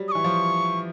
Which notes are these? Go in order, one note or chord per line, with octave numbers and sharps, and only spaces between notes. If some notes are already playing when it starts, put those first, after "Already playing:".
Already playing: F#3 G3
D#6
E3 C#6
F3